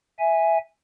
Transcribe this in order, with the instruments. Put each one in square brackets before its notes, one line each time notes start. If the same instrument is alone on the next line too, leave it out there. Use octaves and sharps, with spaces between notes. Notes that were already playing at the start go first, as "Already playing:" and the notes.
[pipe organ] E5 G#5